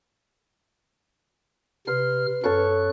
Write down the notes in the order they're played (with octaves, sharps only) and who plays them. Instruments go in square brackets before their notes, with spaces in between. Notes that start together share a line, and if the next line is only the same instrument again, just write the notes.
[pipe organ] C3 F6 [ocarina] B4 [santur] C6
[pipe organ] F#2 F#6 [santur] A4 C#5 C#6